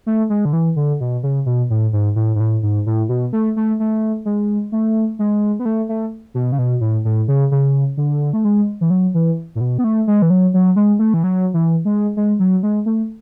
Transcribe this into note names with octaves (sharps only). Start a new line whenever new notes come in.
A3
G#3
D3
E3
D3
B2
C#3
B2
A2
G#2
A2
G#2
A2
G#2
A2
B2
A3
A3
A3
G#3
A3
G#3
B3
A3
A3
B2
C#3
B2
A2
A2
C#3
C#3
D3
A3
G#3
E3
F#3
E3
A2
B2
B3
A3
G#3
E3
F#3
F#3
G#3
A3
E3
F#3
E3
G#3
G#3
F#3
G#3
A3